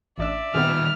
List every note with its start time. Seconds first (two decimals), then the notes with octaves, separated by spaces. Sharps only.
0.18 A1 D4 D5 E5 E6
0.54 D#3 G3 B3 C4 G4 F6